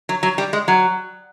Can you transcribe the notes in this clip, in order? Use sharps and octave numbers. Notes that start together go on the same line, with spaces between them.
F#3
F#3
G3
G#3
F#3